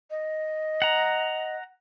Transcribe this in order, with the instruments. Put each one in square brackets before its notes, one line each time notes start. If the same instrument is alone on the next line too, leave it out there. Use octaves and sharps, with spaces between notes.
[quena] D#5
[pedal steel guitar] F#5 A#5